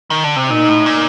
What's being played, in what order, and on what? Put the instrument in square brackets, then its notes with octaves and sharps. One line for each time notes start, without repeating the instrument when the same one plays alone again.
[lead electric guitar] D#3
D3
C3
[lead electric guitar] A#2 [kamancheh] D#4
[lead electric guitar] A2
A#2